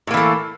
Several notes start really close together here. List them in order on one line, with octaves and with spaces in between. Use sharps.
A2 A#3 E3 A3